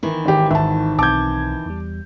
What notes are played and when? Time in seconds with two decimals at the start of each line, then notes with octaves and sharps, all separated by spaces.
0.03 D#3 E3
0.25 G#1 G4
0.51 G#1 E5 A5
0.99 B1 C4 A5 D6 G6 G#6
1.66 E2 G3